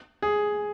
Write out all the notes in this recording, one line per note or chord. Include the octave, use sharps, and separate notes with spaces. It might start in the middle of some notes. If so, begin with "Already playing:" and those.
G#4